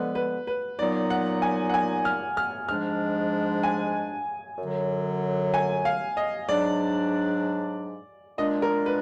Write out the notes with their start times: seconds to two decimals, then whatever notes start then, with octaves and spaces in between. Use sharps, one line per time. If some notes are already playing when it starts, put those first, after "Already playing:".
Already playing: D3 F3 G#3 B3 B4
0.15 B4
0.47 B4
0.79 A#2 F#3 B3 D#4 D5
1.10 F#5
1.42 G#5
1.69 F#5
1.74 G#5
2.05 F6
2.37 F6
2.69 G#2 F3 G#3 D4 F6
3.63 G#5
4.58 F#2 D3 F#3
5.54 G#5
5.85 F5
6.17 D#5
6.48 G#2 F#3 D4 D5
8.38 A#2 G#3 D4 D#5
8.62 A#4
8.86 B4